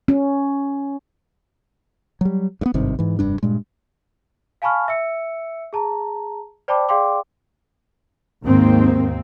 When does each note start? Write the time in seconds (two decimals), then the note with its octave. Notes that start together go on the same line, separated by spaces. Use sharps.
0.08 C#4
2.21 F#3 G3
2.61 G2 B3
2.74 G#1 G2 C3 D#3
2.99 G#2 E3
3.19 F1 G2 D4
3.43 G2 A#2 G#3
4.62 F5 G#5 A5 B5 C#6 F6
4.88 E5 E6 C#7
5.73 G#4 A5 A#5
6.68 C5 D5 G5 A5 B5 D6
6.89 G#4 D5 F5 G5 C6 D6
8.43 D#2 G#2 D#3 A#3 C4